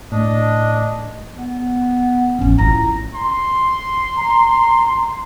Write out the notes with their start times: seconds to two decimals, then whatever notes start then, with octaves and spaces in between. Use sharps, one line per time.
0.12 A2 D4 D#5
1.36 B3
2.39 A1 F2 C#4
2.58 E4 F4 A#5
3.15 C6
4.17 A#5